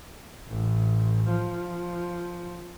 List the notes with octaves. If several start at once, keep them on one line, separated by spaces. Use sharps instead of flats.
A1
F3